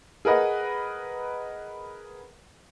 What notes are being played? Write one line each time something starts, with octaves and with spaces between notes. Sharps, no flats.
G#4 A#4 B4 D#5 F#5